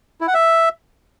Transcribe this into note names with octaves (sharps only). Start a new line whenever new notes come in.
E4
F#5
E5